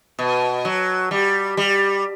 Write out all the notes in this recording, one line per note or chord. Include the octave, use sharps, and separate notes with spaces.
B2
F#3
G3
G3